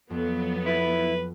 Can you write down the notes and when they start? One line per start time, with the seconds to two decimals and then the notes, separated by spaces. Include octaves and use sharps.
0.10 F2 F#3 B3
0.66 E4 B4